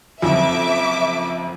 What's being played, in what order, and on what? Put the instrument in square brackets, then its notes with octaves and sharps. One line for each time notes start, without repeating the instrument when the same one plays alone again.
[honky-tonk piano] F#1 F2 [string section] E5 D6